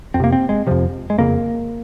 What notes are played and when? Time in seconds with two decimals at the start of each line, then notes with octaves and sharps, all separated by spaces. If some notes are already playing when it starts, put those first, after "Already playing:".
0.14 F2 C4
0.20 C3 A#3
0.32 C4
0.49 G#3
0.67 F2 C3 F3
1.10 G#3
1.18 F2 C#3 A#3